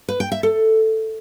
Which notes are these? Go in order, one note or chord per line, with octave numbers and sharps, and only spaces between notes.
B4
G5
E5
A4